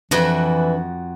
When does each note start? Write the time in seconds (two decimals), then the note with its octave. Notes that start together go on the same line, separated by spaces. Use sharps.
0.11 F2 E3 D4 F#4 B4 E5